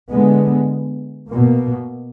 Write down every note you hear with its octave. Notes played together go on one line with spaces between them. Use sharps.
D3 G#3 B3
A#3
B2